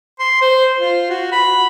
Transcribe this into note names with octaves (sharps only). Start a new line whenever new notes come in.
C6
C5
F4
F#4
B5